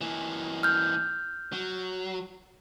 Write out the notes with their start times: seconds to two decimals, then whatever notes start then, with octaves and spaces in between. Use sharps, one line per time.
0.01 E3 A#3
0.63 F6 G6
1.53 F#3